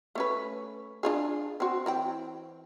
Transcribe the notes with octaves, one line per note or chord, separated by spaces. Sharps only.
A3 C#4 B4
D4 F4 G#4
C4 F#4
E3 C4 G5